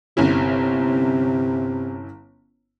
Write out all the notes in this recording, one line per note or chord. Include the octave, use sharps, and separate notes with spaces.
G1 C3 C#4 E4